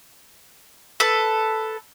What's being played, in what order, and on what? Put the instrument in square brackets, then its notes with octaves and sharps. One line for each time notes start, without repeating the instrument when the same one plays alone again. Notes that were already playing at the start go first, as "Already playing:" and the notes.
[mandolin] A4 B4